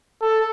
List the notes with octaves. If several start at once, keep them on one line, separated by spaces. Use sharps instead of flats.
A4